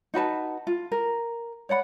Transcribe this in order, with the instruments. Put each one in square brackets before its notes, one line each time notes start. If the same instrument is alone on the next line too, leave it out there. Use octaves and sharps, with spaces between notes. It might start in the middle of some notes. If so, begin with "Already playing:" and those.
[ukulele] D#4 F#4 B4 A5
F4
A#4
C#5 D5 F#5 B5